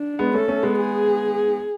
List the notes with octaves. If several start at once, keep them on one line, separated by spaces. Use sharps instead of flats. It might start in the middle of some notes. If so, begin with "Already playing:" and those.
Already playing: D4
G#3 B3
A3 C#4 A4
A3 C#4
G#3 B3
G#4